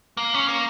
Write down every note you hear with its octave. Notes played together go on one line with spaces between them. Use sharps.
A#3
C#4
A#3